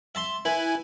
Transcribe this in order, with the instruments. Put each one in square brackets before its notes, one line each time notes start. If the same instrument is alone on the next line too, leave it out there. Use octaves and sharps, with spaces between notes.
[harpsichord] E5 A5 C6
[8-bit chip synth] E4 G#5 [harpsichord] B4